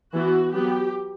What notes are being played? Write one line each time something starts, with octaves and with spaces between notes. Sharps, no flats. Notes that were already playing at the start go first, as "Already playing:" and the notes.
E3 B3 F#4
F#3 B3 G4